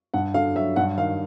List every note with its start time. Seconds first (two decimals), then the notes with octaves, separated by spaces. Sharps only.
0.14 G2 F#5
0.34 D3 F5
0.56 F#3 E5
0.76 G2 F#5
0.98 D#3 F5